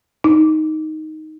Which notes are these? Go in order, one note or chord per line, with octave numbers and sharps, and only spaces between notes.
D#4